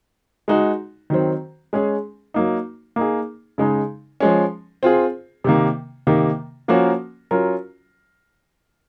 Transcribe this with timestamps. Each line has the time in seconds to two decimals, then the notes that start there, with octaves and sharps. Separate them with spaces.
0.48 G#3 D#4 F#4
1.10 D#3 F#3 C4
1.73 G#3 C#4 G#4
2.34 F#3 A#3 D#4
2.96 A#3 D#4 G#4
3.58 C#3 G#3 D#4
4.20 F3 G#3 C#4
4.83 C4 F4 G#4
5.44 C3 D#3 A#3
6.07 C3 D#3 A#3
6.68 F3 A#3 C#4 F#4 A#4
7.31 F#3 C#4 F4 A#4